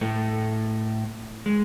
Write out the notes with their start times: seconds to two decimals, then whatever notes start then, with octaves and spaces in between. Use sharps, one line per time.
0.01 A2 A3
1.46 G#3